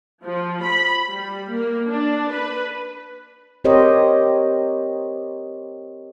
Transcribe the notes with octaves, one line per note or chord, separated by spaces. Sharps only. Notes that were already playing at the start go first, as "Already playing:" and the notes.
F3
B5
G3
A#3
D4
B4
C4 G4 A#4 C5 C#5 D#5